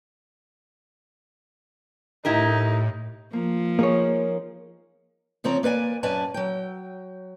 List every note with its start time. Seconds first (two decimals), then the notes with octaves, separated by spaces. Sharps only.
2.25 A2 D#4 E4 G4 A#4
3.33 F3 A#3
3.79 A#3 D#4 G#4 C#5
5.44 C#3 F3 C4 C#5 D5 A#5
5.63 A#3 B4 D5 G#5
6.03 F#2 B4 D5 G#5 A5
6.34 F#3 G5